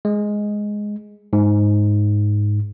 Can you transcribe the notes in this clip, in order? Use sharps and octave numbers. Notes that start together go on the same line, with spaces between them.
G#3
G#2